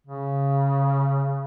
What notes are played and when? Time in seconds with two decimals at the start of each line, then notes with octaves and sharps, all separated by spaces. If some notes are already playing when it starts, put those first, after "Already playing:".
0.07 C#3